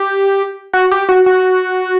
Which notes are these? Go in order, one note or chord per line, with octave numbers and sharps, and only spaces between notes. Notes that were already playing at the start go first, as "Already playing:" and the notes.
Already playing: G4
F#4
G4
F#4
F#4